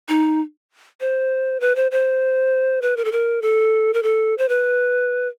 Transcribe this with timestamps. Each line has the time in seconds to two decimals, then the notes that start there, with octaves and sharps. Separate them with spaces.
0.09 D#4
1.01 C5
1.60 B4
1.76 C5
1.91 C5
2.82 B4
2.97 A#4
3.05 A4
3.12 A#4
3.42 A4
3.94 A#4
4.03 A4
4.38 C5
4.49 B4